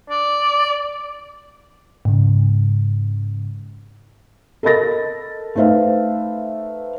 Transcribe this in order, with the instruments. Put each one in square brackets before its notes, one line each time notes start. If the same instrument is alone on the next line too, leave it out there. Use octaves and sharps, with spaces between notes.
[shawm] D5
[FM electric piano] G#2 C#3
[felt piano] A4 A#4 D#5 B5 A6 A#6
A3 D#4 B4 C5 E5 F5